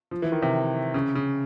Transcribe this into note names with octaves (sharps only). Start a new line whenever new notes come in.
F3
E3
D#3
C3
C#3
C#3